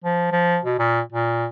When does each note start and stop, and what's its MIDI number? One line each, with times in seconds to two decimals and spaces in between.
0.05 0.29 53
0.32 0.58 53
0.65 0.77 47
0.79 1.00 46
1.13 1.46 46